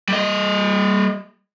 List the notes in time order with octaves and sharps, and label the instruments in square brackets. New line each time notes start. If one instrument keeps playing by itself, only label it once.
[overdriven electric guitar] G3 D#5